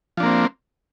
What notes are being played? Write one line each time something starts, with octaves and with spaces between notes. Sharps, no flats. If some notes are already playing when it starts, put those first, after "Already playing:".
F3 A#3 C4 D4